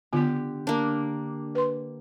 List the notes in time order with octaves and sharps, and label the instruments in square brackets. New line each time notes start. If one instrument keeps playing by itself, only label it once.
[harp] D3 G4 [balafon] B3 F4
[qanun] A#3 D4
[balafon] B4 C6